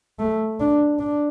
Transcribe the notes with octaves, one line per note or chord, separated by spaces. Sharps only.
A3
D4
D4